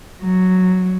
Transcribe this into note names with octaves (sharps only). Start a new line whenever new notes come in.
F#3